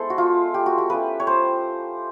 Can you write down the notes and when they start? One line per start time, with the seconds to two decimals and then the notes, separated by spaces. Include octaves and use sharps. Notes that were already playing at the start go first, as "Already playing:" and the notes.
Already playing: G#3 B3 E4 A4 C5
0.10 F#4
0.18 F4
0.54 G4
0.66 F#4
0.78 G4
0.90 A3 C#4 F4 B4
1.20 C#5
1.27 C5